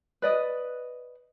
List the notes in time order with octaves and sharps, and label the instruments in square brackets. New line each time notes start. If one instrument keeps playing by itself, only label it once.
[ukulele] B4 D5 D#5